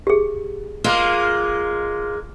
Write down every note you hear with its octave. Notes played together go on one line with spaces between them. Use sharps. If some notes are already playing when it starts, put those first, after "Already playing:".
G4 G#4
G#3 A#3 F4